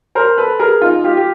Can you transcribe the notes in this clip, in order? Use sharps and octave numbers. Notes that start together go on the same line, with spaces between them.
A#4 C5
A4 B4
G#4 A#4
D#4 F4
F4 G4
G4